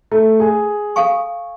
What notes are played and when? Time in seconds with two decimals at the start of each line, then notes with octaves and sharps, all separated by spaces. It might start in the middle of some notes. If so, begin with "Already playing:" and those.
0.12 A3
0.40 G#4
0.96 A4 F5 G#5 C#6